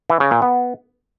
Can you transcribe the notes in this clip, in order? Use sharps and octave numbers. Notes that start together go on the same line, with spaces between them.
E3
C#3
A#2
B3